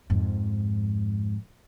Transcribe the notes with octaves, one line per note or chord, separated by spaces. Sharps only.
F2 G#2